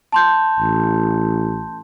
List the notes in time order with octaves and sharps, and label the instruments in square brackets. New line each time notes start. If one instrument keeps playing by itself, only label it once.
[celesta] A5 C6 G6
[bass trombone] A1